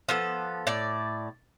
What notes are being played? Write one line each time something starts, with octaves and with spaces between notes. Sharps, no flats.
F3 B3 A4
A2 D5